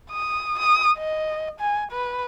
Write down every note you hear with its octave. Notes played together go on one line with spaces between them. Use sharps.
D#6
D#6
D#5
G#5
B4